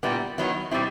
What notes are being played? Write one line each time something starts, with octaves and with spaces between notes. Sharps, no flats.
A#2 G3 B3 E4
D#3 F#3 B3 E4
B2 G3 C4 E4